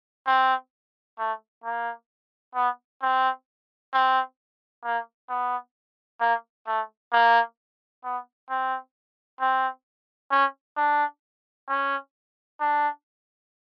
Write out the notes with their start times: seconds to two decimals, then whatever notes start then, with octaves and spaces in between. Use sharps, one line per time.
0.27 C4
1.19 A3
1.64 A#3
2.55 B3
3.02 C4
3.93 C4
4.84 A#3
5.29 B3
6.20 A#3
6.67 A3
7.13 A#3
8.04 B3
8.50 C4
9.40 C4
10.31 C#4
10.77 D4
11.69 C#4
12.60 D4